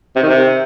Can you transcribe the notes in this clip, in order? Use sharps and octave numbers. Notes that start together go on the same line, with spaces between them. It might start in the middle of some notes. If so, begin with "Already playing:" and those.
C3
D#3
C3